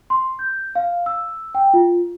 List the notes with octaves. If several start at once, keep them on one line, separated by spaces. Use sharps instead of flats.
C6
G6
F5
E6
G5
F4